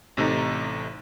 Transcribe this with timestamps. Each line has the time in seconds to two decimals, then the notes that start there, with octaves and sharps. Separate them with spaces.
0.17 A1 C3 A3 D#4 A#5